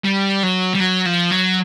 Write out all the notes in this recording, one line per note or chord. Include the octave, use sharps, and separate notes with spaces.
G3
F#3
G3
F#3
F3
F#3